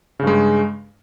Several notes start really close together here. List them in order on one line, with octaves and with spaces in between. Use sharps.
C#3 G2 G#3